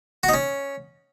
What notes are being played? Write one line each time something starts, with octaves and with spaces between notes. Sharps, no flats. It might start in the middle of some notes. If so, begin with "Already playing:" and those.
F#4
D#4
C#4